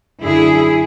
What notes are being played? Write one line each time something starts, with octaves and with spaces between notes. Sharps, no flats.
F#2 D3 E4 G#4